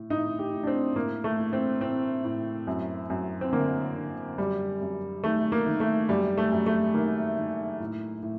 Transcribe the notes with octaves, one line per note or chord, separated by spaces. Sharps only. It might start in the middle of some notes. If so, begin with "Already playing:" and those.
Already playing: A2
A2 D#4
G4
A2
D4
C4
A2 A#3
A3
A2
C4
A2 C4
A2
F#2
F#2
C4
D3 A#3
D3
F#2 G3
F#2
D#3 A3
A#3
D#3
A3
F#2 G3
A3
F#2
A3
D#3 A#3
D#3
A2
A2